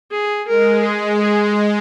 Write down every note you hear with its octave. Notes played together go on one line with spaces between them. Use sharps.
G#4
G#3 A#4
G#3 G#4
G#4